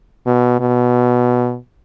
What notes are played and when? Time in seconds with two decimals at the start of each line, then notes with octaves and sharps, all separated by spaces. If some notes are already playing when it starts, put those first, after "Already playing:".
0.26 B2
0.60 B2